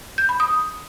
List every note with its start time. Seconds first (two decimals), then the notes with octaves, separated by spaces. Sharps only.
0.18 G6
0.29 B5
0.40 D#6